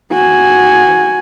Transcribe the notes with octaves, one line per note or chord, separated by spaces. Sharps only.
F#4 G#5